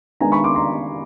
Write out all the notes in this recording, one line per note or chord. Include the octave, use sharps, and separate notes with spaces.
D#3 G#3 B3 D4 G#5 A#5
B5 C#6
C6 D6
A#5 C6